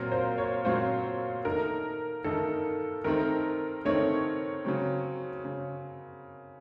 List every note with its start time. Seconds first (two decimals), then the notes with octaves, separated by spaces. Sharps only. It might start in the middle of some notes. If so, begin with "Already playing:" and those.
Already playing: A#2 F#3 C4 F4 A#4
0.12 C5
0.38 C#5
0.65 A#2 F#3 C4 F4 C5
1.45 D#3 A3 D#4 A#4
2.24 D#3 A3 D#4 A4
3.04 D#3 A3 C4 D#4 A#4
3.85 D#3 A3 C4 D#4 C#5
4.65 C#3 F#3 C4
5.45 C#3